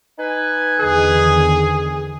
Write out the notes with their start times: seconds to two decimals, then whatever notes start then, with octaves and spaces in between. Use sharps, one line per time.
0.19 D#4 B4 G#5
0.80 E2 D3 D#3 G#4